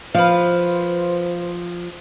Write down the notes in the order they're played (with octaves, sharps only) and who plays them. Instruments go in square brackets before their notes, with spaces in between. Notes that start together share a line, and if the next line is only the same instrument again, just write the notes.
[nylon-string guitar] F3 [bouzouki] B4 F5 [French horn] C5